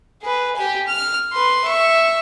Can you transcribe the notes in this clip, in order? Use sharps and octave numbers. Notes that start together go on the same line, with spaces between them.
G#4 B4
G4 G#5
F6
B4 C6
E5 C#6